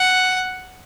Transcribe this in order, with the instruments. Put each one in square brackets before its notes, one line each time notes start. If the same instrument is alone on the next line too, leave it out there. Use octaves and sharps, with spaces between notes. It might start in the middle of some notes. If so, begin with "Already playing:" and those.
Already playing: [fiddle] F#5